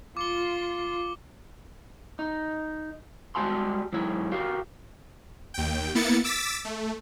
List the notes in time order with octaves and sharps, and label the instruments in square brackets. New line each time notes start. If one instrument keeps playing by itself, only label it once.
[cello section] F4 [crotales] D6 C#7 G7
[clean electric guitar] D#4
G3 G#3 F#4 G#5 A5 C6
G#2 F#3 E4 C#5
F#4 G4 A#4 F5
[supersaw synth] D#2 G5
A#3 B3 E4 A6 C#7
D6 E6 A6 B6
A3